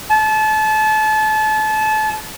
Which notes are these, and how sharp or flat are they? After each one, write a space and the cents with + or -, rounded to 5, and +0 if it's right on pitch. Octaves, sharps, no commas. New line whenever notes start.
A5 -30